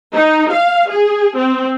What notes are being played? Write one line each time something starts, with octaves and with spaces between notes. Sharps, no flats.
D#4
F5
G#4
C4